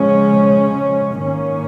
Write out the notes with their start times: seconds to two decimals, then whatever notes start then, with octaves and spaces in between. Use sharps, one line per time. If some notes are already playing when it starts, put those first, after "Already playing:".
Already playing: C#3 F3 G#3 C#4
1.21 G#2 D#3 A#3 C#4